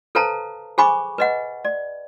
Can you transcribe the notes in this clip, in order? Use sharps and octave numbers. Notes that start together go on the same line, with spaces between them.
A4 B4 C5 F5 A5 A#5
G#4 C5 G#5 B5 C#6 D6
B4 D#5 F#5
D5